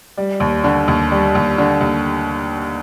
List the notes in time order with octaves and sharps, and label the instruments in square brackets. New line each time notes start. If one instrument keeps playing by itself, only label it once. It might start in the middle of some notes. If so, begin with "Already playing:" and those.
[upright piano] G3
D#2
D3
D#2
G3
D#2
D3
D#2